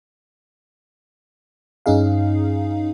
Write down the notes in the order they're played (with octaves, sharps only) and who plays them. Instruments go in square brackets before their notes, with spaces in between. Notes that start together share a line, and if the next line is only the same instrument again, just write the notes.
[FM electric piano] G2 C#4 D#4 G#4 F5